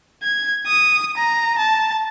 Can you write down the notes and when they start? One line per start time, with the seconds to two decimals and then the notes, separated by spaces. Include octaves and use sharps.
0.23 G#6
0.67 D#6
1.17 A#5
1.58 A5